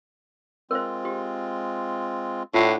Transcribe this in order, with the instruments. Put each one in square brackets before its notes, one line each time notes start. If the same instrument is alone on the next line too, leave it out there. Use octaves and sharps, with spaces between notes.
[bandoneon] G#3 C4 F4 [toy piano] A#4 C5
[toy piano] G4
[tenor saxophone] A2 [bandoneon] D4 F#5 G5 [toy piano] F4